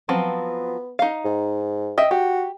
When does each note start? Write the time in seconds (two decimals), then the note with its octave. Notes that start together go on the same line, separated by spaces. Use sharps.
0.09 F3 F#3 B3 C4
0.99 D#4 F5
1.25 G#2
1.98 D#5 E5 G5
2.11 F#4 G4